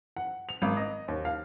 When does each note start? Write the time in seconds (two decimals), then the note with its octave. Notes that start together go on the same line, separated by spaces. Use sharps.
0.16 F#5
0.49 F7
0.62 G#1
0.77 D#5
1.08 D#2
1.25 F5